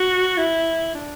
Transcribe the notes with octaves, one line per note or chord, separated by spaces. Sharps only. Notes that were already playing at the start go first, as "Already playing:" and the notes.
Already playing: F#4
E4
D4